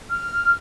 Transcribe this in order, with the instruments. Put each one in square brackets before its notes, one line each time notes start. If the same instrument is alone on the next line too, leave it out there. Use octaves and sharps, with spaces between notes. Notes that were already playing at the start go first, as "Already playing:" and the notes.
[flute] F6